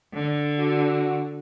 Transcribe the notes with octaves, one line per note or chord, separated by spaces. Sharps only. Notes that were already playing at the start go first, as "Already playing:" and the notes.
D3
F#4